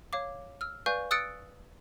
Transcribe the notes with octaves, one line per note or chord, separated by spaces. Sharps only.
C#5 F5 D6
E6 F6
B4 D5 F5 G#5 C#6 G6
D#6 E6 F#6 A6 C#7 D7